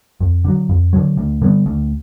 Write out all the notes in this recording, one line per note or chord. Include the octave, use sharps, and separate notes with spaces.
F2
D3 F#3
F2
D3 F#3
D2
D3 G3 B3
D2